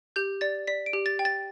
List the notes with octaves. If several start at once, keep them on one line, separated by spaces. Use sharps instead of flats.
G4 G6
D5 A6
D5 B6
D7
G4
A6
G5
A6